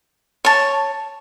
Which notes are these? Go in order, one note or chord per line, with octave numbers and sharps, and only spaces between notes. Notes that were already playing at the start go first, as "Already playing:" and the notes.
C#5 A5